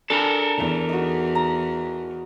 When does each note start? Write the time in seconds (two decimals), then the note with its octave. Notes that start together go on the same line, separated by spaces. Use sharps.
0.10 D4 A4 A#4 G#5 B5
0.58 E2
0.89 D#4 F#4
1.35 A#5